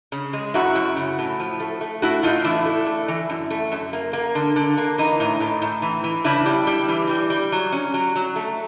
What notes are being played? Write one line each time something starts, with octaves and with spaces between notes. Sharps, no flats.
C#3
G#3
F#2 E4 F#4
F#2
C#3
A2
F3
A3
A3
A2 E4 F#4
A2 D#4 F4
E3 D4 E4
A3
A3
E3
F#2
A3
F#2
A#3
A#3
D3
D3
A#3
E3 D#4
A2
A2
A2
E3
E3
C#3 D4 E4
G3
G3
E3
G3
G3
F#3
C#4
F#3
F#3
A3